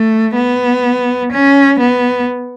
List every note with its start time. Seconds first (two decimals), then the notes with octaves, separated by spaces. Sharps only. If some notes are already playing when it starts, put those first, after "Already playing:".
Already playing: A3
0.35 B3
1.32 C#4
1.79 B3